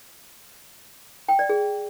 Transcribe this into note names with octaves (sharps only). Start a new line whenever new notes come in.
G5
D5
G#4